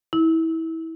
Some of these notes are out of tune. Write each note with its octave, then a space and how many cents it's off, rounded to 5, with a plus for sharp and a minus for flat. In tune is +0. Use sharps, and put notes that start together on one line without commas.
E4 -25